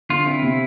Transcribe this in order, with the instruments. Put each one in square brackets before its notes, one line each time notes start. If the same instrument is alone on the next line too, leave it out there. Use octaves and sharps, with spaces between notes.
[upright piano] D3 [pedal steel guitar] F4
[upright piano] C4 [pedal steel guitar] E4
[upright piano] C3